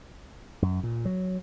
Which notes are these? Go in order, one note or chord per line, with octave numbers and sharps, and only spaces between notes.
F#2
A#2
F#3